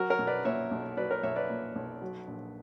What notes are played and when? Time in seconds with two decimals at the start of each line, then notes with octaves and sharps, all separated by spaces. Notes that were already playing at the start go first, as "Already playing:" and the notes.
Already playing: F#3 F#4 A#4
0.10 A#4 C#5
0.19 B1
0.27 B4 D5
0.45 A#2 C#5 E5
0.71 B1
0.97 F#3 B4 D5
1.10 A#4 C#5
1.23 B1 C#5 E5
1.36 B4 D5
1.50 A#2
1.76 B1
2.02 F#3
2.27 A#1